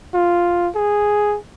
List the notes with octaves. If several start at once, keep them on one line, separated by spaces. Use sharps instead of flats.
F4
G#4